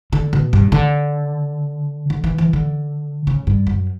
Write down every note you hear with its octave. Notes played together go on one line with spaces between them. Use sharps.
D3
B2
G2
D3
D3
E3
E3
D3
C#3
G2
F#2